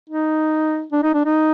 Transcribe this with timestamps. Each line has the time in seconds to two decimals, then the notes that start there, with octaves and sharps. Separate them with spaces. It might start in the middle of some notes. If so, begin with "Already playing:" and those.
0.09 D#4
0.92 D4
1.03 D#4
1.14 D4
1.25 D#4